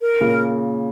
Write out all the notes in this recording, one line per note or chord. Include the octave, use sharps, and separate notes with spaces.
A#4
A#2 C#3